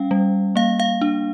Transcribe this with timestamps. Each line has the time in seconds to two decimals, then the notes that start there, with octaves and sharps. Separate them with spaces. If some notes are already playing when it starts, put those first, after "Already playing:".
Already playing: G3 C#4 F5 G5
0.11 G3
0.56 A#3 F5
0.80 F5
1.01 D4